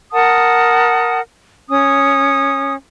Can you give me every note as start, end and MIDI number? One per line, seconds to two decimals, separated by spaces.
0.12 1.19 70
0.12 1.19 78
0.12 1.19 81
0.12 1.19 87
1.70 2.74 61
1.70 2.74 87